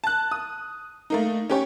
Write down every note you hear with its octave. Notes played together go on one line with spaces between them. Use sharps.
A5 F#6
D#6
A3 A#3 D#4
C#4 G4 C#5